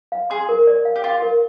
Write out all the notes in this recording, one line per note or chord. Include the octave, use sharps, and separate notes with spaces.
F5
G#4 C6
A#4
D5
F5
G4
F4 C6
A#4